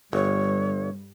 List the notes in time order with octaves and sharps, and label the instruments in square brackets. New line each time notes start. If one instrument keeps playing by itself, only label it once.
[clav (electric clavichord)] G1 [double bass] G2 G3 [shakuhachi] C#5